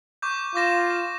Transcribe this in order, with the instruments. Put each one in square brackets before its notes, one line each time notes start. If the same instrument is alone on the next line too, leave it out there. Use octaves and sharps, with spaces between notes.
[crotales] C#6 D6 G6
[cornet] F4 [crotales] D6 A#6 E7